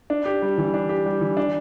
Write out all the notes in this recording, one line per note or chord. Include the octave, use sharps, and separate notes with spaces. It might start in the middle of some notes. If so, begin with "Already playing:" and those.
D4
G4
G3
E3
D4
G4
G3
E3
D4